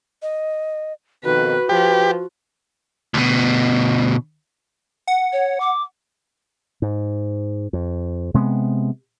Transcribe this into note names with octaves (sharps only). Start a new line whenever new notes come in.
D#5
F2 B2 D#3 F#4 B4
F3 G4 B4
D2 B2
F#5
C#5
D6
G#2
F2
C3 G#3 A3 B3